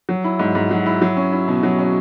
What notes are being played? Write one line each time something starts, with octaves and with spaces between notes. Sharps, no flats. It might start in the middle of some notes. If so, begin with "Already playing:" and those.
F#3
E4
G#2
G#2
F#3
E4
F#3
C#4
E4
B2
F#3
C#4